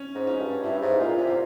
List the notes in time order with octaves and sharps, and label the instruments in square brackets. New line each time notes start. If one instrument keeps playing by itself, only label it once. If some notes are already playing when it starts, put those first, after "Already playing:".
Already playing: [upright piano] C#4
[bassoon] G#2
[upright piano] C#4
[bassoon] G2
[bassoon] G2 [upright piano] E4
[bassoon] G#2
[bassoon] A#2 [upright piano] F4
[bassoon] C3
[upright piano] F4